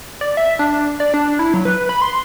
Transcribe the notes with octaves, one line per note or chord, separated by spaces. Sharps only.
D5
E5
D4
D5
D4
E4
F#3
B4
B5
C6